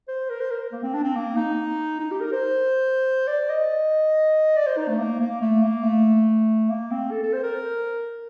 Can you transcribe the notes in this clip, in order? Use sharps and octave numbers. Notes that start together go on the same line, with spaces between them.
C5
A#4
C5
A#4
A#3
C4
D4
C4
A#3
D#4
D#4
G4
A#4
C5
D5
D#5
D5
C5
D#4
A3
A#3
A#3
A3
A#3
A3
A#3
C4
A4
A4
C5
A#4